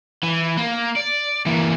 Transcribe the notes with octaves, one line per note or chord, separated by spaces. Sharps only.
E3
A#3
D5
E3 A#3